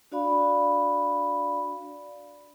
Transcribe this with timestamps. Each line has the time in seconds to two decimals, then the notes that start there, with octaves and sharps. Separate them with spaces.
0.12 D4 F#4 D5 F5 B5